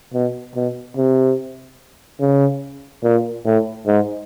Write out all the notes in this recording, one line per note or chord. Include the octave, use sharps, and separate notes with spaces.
B2
B2
C3
C#3
A#2
A2
G#2